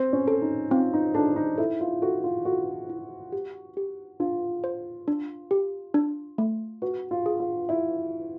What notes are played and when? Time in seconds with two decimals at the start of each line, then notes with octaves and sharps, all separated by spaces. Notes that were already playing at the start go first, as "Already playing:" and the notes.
Already playing: C4
0.13 C#4
0.28 A4
0.42 D#4
0.71 C4 F4
0.94 D#4
1.14 D4 A4
1.36 D#4
1.58 E4 A4
1.81 F4
2.02 F#4 A4
2.24 F4
2.45 F#4 A4
2.90 E4
3.32 G4
3.77 G4
4.20 D4 F4
4.64 C5
5.08 D4
5.51 G4
5.94 D4
6.38 A3
6.82 F#4 B4
7.11 F4
7.26 G#4
7.40 F4
7.69 E4 E5